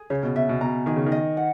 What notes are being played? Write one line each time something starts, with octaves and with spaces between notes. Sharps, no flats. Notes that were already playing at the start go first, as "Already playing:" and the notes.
Already playing: G#4
C#3 C#5
B2
B2 E5
B2
B2 A#5
D#3 G#4
C#3
D#3
D#5
F#5